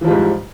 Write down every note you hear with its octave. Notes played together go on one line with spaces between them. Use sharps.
G#2 E3 F3 G3